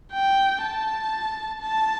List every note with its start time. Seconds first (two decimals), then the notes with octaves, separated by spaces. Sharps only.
0.13 G5
0.63 A5
1.61 A5